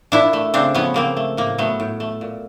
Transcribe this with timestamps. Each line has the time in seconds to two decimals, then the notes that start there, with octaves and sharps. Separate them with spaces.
0.12 A#2 D4 E4
0.33 A3
0.54 C#3 C4 D4
0.74 F3 B3 C#4
0.94 C#3 A#3 C4
1.17 A3
1.37 A2 A#3
1.58 F#3 A3 B3
1.80 A2
2.00 A3
2.21 A#2